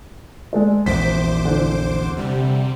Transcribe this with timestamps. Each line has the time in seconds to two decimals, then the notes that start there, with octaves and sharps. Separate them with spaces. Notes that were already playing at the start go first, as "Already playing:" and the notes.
0.53 G#3 A4 D5
0.86 A#1 E2 C5 D6 B6
1.45 D3 E3
2.17 C3 G3